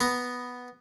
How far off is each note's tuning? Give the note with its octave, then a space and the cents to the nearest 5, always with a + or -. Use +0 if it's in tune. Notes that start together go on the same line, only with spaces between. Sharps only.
B3 +0 A#5 +0